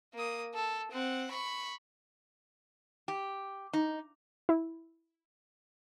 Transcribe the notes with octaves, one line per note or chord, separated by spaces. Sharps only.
A#3 D#6
A4
C4 F#5
B5 C#6
G4
D#4
E4